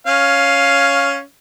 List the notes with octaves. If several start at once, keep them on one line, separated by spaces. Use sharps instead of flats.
C#4 F5